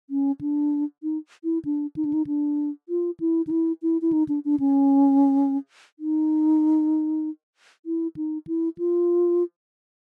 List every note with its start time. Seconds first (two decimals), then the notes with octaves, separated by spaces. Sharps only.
0.10 C#4
0.41 D4
1.03 D#4
1.44 E4
1.65 D4
1.96 D#4
2.05 D4
2.13 D#4
2.27 D4
2.89 F4
3.20 E4
3.47 D#4
3.51 E4
3.82 E4
4.02 E4
4.13 D#4
4.29 D4
4.45 D4
4.60 C#4
5.99 D#4
7.86 E4
8.16 D#4
8.47 E4
8.78 F4